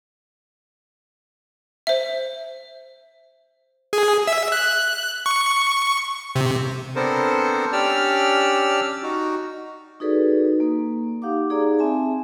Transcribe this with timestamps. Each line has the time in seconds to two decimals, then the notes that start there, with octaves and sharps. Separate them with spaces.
1.87 C5 E5
3.93 G#4
4.27 E5
4.52 F#6
5.26 C#6
6.36 C3
6.96 B3 C4 D4 A4 A#4 C5
7.73 C#4 D4 G4 D5 E6 F6
9.03 D#4 F#4
10.00 D#4 F#4 G#4 A4 B4 D5
10.45 D#4
10.60 A#3
11.22 D#4 G4 F5 F#5 D6
11.50 D#4 G#4 D5 A#5
11.79 C4 E5 G#5 A5